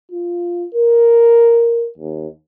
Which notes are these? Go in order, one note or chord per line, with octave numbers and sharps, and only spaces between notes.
F4
A#4
D#2